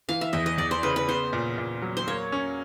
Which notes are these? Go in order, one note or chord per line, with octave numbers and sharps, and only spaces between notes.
E3 F5
E5
E2 D#5
D#5
E2 D5
C5
C#3 B4
B4
B3 C5
A#2
A#2
F#3
C5
A#3 C#5
C#4